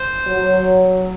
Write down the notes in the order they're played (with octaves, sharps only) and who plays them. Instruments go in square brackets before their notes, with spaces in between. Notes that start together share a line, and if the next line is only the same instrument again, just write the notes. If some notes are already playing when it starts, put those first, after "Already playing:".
Already playing: [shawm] C5
[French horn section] F#3